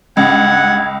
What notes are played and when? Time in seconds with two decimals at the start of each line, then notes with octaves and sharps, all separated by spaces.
0.17 C#2 G2 F#5 G#6